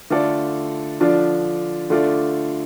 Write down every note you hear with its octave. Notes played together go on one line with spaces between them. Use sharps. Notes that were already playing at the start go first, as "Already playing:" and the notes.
D3 A3 F4 A4 D5
D3 F3 D4 F4 D5
D3 A3 F4 D5